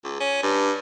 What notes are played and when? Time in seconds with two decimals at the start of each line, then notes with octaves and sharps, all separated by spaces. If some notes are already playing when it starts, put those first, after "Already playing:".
0.04 C#2
0.20 C#4
0.43 G2